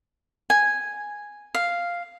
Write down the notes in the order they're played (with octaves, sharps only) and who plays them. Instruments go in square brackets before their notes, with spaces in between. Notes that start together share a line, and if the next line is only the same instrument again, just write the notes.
[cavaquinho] G#5
F5